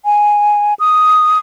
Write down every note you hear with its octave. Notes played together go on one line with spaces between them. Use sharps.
G#5
D#6